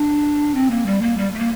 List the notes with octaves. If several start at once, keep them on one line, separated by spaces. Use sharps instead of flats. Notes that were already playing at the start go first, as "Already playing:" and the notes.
Already playing: D4
C4
A#3
G3
A#3
G3
A3
A#3